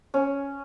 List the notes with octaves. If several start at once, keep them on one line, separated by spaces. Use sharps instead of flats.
C#4